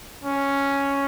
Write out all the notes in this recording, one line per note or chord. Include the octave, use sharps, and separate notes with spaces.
C#4